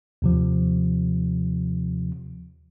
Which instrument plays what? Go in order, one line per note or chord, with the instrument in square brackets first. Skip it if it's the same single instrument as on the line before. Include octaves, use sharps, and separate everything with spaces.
[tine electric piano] D#2 C3 F3